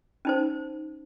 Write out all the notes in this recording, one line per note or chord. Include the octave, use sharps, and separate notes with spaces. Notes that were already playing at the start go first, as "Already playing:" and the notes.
C#4 D#4 C5